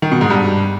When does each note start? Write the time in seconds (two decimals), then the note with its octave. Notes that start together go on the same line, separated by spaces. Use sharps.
0.02 D#3
0.12 B2
0.21 G#2
0.30 G2